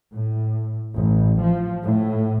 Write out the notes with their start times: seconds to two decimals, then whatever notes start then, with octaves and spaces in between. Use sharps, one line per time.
0.14 A2
0.93 A1
1.42 F3
1.83 A2